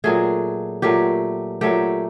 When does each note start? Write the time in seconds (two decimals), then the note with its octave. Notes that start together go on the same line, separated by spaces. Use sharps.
0.04 A#2 F#3 A3 G#4
0.82 A#2 F#3 A3 G4
1.61 A#2 F#3 A3 G4